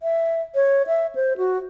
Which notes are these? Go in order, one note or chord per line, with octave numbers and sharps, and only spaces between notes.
E5
C#5
E5
C5
F#4